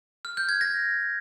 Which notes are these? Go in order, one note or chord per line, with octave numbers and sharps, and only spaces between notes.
F6
G6
G#6
A#6